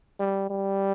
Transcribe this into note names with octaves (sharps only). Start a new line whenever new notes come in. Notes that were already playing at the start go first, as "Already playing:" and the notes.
G3
G3